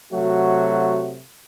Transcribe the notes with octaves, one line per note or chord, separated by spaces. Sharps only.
C3 F#3 A3 F#4